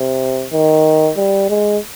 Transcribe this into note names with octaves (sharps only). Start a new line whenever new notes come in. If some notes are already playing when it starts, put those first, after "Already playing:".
Already playing: C3
D#3
G3
G#3